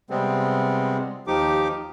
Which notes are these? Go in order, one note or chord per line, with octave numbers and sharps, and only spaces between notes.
C3 G3 G#3 B3 C4
D#2 F3 D#4 G4 D6